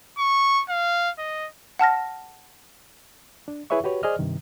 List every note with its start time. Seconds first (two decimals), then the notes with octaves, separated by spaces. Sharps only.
0.18 C#6
0.69 F5
1.19 D#5
1.79 F#5 A5 F6 A#6
3.48 D4
3.70 E4 G#4 B4 C#5 E5 C#6
3.84 F#4 G4 B4 C#5
4.03 G#4 C5 D5 D#5 F6
4.19 G2 C3 D#3